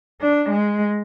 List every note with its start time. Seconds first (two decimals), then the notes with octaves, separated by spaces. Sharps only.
0.21 D4
0.51 G#3